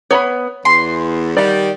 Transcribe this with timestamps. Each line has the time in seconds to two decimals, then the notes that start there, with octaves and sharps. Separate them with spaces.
0.11 B3 C#5 A#5 B5
0.65 E2 C6
1.37 D#3 G3 D5 F#5